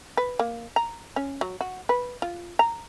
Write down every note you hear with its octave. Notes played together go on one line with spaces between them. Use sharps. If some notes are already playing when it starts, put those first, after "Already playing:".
B4
A#3
A#5
C#4
F#3
F#4
B4
F4
A#5